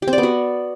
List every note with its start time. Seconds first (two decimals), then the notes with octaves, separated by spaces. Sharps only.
0.02 G4
0.08 C4
0.13 D5
0.18 B3
0.23 F#4